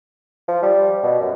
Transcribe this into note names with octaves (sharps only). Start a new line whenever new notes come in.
F3
G3
B2
F#2